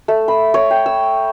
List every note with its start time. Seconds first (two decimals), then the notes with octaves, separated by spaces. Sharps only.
0.08 A3
0.28 B5
0.54 C#5
0.70 G5
0.86 E6